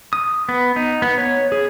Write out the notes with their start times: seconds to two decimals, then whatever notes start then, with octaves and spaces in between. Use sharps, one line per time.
0.13 D#6
0.49 B3
0.76 D#4
1.02 B3
1.18 C#5
1.52 G#4